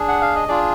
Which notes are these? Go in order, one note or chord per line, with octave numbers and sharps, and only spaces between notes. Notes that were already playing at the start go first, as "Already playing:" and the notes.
Already playing: D4 G#4
F#5
F5
D#5
D4 F4 G#4 D5